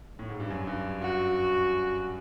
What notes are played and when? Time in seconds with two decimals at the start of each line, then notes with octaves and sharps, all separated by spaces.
0.19 A2
0.29 G#2
0.40 G2
0.50 F#2
0.67 G2
1.02 F#4